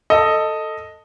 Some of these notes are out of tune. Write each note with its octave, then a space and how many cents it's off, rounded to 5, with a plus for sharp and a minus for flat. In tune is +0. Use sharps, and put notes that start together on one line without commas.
A4 +10 D#5 +0